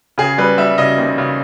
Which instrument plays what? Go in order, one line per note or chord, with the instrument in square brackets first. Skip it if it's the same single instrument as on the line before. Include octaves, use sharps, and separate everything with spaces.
[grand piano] C#3 G#4
G3 B4
G3 E5
C#3 D#5
D#2
C#3